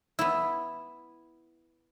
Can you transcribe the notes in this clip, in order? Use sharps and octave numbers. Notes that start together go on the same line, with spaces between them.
B3 E4